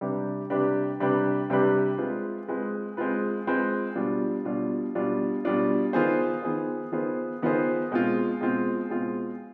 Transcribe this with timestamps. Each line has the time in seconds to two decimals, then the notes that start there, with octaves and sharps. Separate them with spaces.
0.01 C3 G3 D4 G4 B4
0.50 C3 G3 D4 G4 B4
1.00 C3 G3 D4 G4 B4
1.50 C3 G3 D4 G4 B4
1.98 G#3 C4 F4 B4
2.48 G#3 C4 F4 B4
2.97 G#3 C4 F4 B4
3.47 G#3 C4 F4 B4
3.96 B2 G3 D4 F4
4.45 B2 G3 D4 F4
4.95 B2 G3 D4 F4
5.45 B2 G3 D4 F4
5.93 D#3 B3 F4 G#4 C5
6.43 D#3 B3 F4 G#4 C5
6.92 D#3 B3 F4 G#4 C5
7.42 D#3 B3 F4 G#4 C5
7.91 B2 G#3 C4 F4
8.41 B2 G#3 C4 F4
8.90 B2 G#3 C4 F4